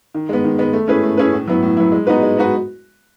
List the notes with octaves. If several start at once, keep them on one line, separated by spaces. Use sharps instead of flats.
D#3
G#3 B3
D#3
G#3 B3
A3
C#4 E4 G#4 B4
A3
C#4 E4 G#4 B4
A2
F#3 B3 E4
A2
F#3 B3 E4
G#3
B3 D#4 F#4 B4
G#3
B3 D#4 F#4 B4